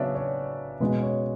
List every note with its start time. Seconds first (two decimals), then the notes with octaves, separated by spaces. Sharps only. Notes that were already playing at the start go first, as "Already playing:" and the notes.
Already playing: C#3 F#3 B3 D4 C#5 D5 E5
0.15 C#5
0.80 B2 G#3 C#4 B4
1.03 C#5